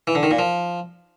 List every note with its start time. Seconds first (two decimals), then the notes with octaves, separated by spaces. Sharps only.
0.07 E3
0.15 D3
0.23 D#3
0.31 A#2
0.39 F3